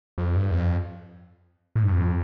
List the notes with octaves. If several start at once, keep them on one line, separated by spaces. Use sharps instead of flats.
F2
G2
E2
F2
A2
G2
F2